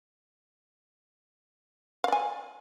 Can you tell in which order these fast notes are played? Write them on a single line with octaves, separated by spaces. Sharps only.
F5 D5 G#5